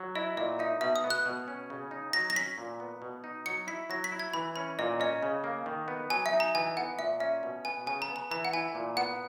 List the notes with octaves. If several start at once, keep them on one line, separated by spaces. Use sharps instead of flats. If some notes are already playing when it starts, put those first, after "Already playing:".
Already playing: F#3
E4 D#5
A#2 D#5
D#4 E5
B2 E5
D#6
B3
F#6
B2
C#4
C#3
D#4
F#3 A#6
A#6
C#4 B6
A#2
B3
B2
D#4
F#3 C#7
E4 B6
F#3 A#6
B6
E4
G#6
E3 B5
C#4 B5
A#2 D#5
C#4 D#5
C#3
A#3
D#3
B3
F#3 G#5
E5
D#4
A#5
E3 G#5
B3 F#5
A#2 E5
C#4 E5
B2
B3 G#5
C#3 G#5
A#5
B3
A#5
E3 A#5
F#5
E4 G#5
A#2
B3 F#5